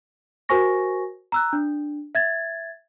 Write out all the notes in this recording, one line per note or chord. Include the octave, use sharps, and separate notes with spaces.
F#4 A#4 C5 G#5 C#6 A#6
A#5 E6 F#6
D4
E5 G#6 A6